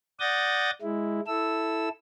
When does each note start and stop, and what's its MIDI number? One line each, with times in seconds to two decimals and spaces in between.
0.20 0.71 74
0.20 0.71 78
0.20 0.71 87
0.20 0.71 91
0.20 0.71 93
0.20 0.71 94
0.82 1.20 56
0.82 1.20 64
1.27 1.89 64
1.27 1.89 69
1.27 1.89 88